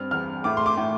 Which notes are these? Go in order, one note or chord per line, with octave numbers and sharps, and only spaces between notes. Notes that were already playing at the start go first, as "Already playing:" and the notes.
Already playing: G2 C4 F6
E2 F6
A2 D6
C6
D6
A2